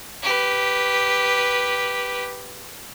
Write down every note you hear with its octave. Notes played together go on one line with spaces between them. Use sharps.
G4 B4